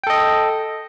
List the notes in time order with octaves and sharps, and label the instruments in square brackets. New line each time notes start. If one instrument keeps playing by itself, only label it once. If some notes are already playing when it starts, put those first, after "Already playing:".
[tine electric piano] G5
A4
D#5